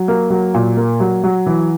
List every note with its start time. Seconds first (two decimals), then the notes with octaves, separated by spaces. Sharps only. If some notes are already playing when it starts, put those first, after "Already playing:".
Already playing: F#3
0.08 A#3
0.30 F#3
0.54 A#2
0.77 A#3
1.00 F#3
1.24 F#3
1.46 E3